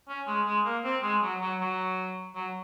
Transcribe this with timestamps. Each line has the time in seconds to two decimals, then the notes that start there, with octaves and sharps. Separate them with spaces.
0.08 C#4
0.27 G#3
0.46 G#3
0.65 A#3
0.84 C4
1.02 G#3
1.22 F#3
1.41 F#3
1.60 F#3
2.35 F#3